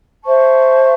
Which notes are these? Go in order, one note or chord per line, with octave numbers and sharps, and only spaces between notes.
C5 E5 A5 C#6